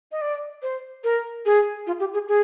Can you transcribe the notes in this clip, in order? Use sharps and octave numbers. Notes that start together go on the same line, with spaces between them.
D#5
D5
C5
A#4
G#4
F4
G4
G#4
G#4